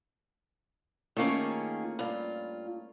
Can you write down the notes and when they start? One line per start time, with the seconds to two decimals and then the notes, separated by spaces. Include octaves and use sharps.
1.17 D#3 A3 A#3 C#4 F4 G#4
1.99 G2 F4